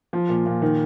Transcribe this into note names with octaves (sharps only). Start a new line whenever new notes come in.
F3
A#2
A#2
D#3